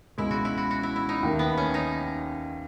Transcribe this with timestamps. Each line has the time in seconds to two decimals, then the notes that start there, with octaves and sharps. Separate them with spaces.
0.18 C#2 B2 G#3 E4
0.31 F#4
0.45 E4
0.57 F#4
0.71 F#4
0.83 E4
0.96 E4
1.09 D#4
1.23 D#2 D#3 A3
1.39 B3
1.57 C#4
1.74 D#4